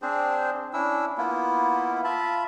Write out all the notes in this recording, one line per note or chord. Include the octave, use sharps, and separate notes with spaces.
C4 D4 G#4 C5
C#4 D4 E4 E6
A#3 B3 E4 F4
F4 E5 A5 B5